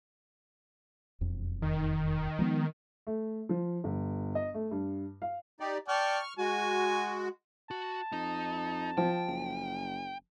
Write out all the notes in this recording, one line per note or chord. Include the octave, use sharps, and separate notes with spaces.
E1 F2
D#3
F3 G#3 B3
A3
F3
G1
D#5
A3
G2
F5
D#4 G4 D5
D5 G5 A5 C#6 F6
G#3 F#4 G#5
F#4 A5
F2 D#4
F3 G5
F#1